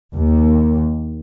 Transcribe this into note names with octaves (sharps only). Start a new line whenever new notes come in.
D#2